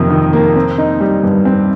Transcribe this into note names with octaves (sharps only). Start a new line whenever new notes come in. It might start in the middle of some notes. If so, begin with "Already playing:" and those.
Already playing: F2 C3 D#3 A#3
D#3
A#3
C4
D#4
G3
G2
C4